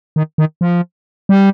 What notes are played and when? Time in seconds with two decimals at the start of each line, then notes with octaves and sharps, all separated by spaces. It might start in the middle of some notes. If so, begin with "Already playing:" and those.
0.16 D#3
0.38 D#3
0.61 F3
1.29 G3